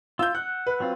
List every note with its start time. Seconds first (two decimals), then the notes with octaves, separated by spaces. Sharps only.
0.19 F4 E6 G6
0.35 F#5 F#6
0.67 B4
0.80 F#3 C4 F4